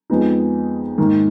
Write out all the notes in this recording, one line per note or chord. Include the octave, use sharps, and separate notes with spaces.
F2 F3 G#3 B3 D#4
G#2 D#3 A#3